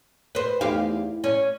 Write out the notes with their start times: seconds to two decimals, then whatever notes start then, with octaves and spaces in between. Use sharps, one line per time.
0.35 B4 C5
0.61 E2 A3 D#4 G4 C5 F5
0.91 E4
1.24 C#4 D5